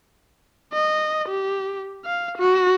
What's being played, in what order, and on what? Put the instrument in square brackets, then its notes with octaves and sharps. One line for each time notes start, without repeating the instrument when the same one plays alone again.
[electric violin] D#5
G4
F5
F#4